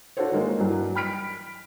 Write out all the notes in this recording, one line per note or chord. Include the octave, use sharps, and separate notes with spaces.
D4 F4 F#4 A4 C5 C#5
D#3 G#3 A#3
G2 E3 F#3
G5 B5 F6 B6 D7